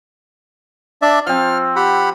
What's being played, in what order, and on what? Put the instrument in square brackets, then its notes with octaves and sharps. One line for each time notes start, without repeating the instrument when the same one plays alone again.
[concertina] D4 D5 E5
[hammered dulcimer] F3 C4 [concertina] F6
[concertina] G4 F#5 B5